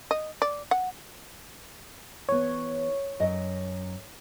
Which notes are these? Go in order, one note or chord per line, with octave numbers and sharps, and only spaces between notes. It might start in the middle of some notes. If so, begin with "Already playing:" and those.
D#5
D5
F#5
E3 B3 C#5
F#2 D#5